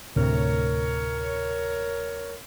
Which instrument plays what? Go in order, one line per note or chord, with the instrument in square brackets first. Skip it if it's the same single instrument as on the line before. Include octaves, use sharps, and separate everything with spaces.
[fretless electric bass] D2 A2 C3 [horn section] A#4 C#5